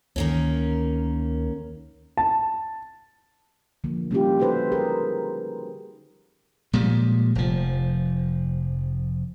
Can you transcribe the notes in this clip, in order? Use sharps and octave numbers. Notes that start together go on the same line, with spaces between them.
D2 D#3 A#3 C#4
A5
D3 F3 A#3
G3 A#3 C#4 E4 F4 G4
D#4 F#4 A4 B4 C5
G#4 A#4
A#2 F3 G3 G#3
F1 F3